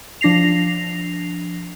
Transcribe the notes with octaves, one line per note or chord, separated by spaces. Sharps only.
F3 D4 A#6 C7 F7